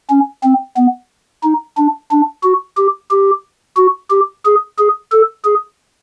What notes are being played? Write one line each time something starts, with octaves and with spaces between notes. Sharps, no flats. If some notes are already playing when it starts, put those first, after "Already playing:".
C#4
C4
B3
D#4
D4
D4
F#4
G4
G4
F#4
G4
G#4
G#4
A4
G#4